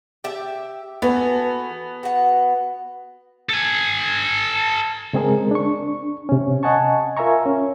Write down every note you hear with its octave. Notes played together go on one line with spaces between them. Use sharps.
G4 E5
E3 B3 F#4 A4
F#4 F#5
A4 G#5
C#3 G#3 C4 G#4 A#4
D4 C#6
C3 C#4
D#5 F#5 G#5 A5 C#6
F4 A#4 E5 G#5 A#5 C#6
C#4